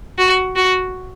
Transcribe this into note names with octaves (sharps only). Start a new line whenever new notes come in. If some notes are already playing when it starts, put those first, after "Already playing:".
F#4
F#4